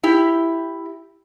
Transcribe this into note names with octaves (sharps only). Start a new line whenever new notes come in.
E4 G4